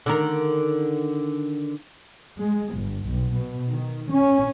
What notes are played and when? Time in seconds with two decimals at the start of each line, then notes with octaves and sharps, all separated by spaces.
0.06 D3 D#3 A#4
2.39 G#3
2.73 G1
3.04 B1
3.32 B2
3.70 D#3
4.11 C#4